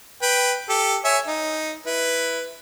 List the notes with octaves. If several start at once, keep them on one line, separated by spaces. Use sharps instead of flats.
B4 G5
G4 A4
C#5 E5 G#5
D#4
E4 B4